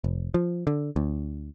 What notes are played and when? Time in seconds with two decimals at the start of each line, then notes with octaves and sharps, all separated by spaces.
0.04 F1
0.34 F3
0.67 D3
0.96 D2